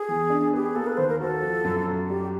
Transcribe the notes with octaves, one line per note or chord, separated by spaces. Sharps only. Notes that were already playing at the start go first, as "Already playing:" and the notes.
Already playing: G#4
E2
D4
B3 G4
G#4
A#3 A4
B4
D#2 C5
A#4
F#4 A4
F3
F#2
F#2
G3 G4